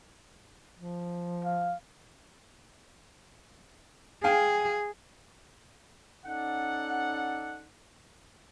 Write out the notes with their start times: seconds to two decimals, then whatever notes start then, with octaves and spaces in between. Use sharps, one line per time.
0.78 F3
1.45 F5
4.24 G#4 F5 G5 G#5
6.26 C#4 D#4 A4 D5 F#5